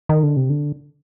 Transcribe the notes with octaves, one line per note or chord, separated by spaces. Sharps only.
D#3
D3
C3
D3